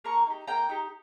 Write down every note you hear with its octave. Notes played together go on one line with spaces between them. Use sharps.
A#3 A#5 C#6
D#4 G4
A#3 G5 A#5
D#4 G4